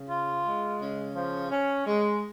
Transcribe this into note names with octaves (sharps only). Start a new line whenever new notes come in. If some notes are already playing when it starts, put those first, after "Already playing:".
Already playing: C#3
F4
G#3
C#3
F3
C#4
G#3